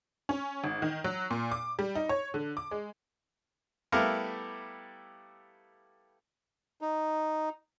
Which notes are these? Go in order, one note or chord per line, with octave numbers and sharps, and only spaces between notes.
C#4
G#1
D#3
F#3
A#2
D6
G3
D#4
C#5
D3
D6
G#3
G3 A3 B3 E4 A#4 F5
D#4